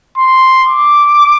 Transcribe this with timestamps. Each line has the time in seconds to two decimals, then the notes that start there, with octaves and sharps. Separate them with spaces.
0.17 C6
0.68 D6